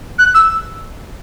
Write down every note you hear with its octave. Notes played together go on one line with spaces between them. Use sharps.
F#6
E6